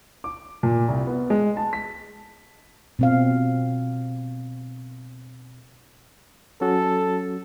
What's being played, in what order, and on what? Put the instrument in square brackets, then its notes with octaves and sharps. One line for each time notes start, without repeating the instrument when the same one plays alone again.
[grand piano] D6
A#2
C2
B3
G#3
A5
B6
[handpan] B2 C4 F5
[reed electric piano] F#3 C#4 F#4 [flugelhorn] A4